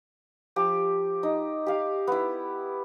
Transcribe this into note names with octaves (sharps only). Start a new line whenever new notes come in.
F3 G4
D#4
G4 F5
B3 E4